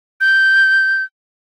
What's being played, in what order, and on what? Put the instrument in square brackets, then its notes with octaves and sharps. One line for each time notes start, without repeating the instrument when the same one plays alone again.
[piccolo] G6